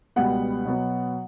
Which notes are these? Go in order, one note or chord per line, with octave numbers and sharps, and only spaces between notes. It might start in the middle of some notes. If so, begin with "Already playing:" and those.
C#2 B2 G3 B3 F#5
B2 F#3 B3